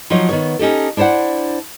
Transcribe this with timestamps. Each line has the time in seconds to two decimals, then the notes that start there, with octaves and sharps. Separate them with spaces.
0.10 F3 F#3 D#4 F4 C#5
0.29 D#3 B3 C#5
0.59 C#4 D#4 G4 A4
0.97 D4 E4 C5 D5 F#5